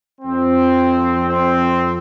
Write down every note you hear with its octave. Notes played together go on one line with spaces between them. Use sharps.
F2 F3 C4
C4